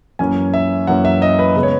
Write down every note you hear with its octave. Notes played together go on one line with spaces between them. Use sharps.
F#2 E3 A#3 C#4 G#5
E5
F#2 E3 A#3 C#4 F#5
E5
D#5
B4
C#3 G#3 B3 B4
C#5